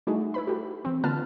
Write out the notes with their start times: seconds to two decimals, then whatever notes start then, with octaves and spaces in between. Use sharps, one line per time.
0.07 G3 A3 D#4 E4 F#4 G#4
0.34 E4 B4 B5
0.47 F#4 G4 A4
0.85 E3 C4
1.04 D3 A#3 F4 B4 A5 F6